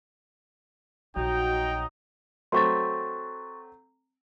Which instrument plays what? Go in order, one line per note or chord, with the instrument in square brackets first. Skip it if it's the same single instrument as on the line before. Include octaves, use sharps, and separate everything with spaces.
[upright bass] A#1 [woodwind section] F#3 D#4 [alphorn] F#4 [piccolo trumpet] G5
[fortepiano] F#3 A3 C4 [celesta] C6 C#6 A6